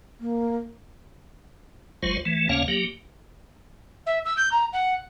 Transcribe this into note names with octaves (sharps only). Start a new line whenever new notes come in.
A#3
F#1 C#2 F#3 G#3 F4 C5
E3 A3
D2 C#3 A#3 C#4 C#5 F5
F#3 A#3 G4
E5
E6
G6
A#5
F#5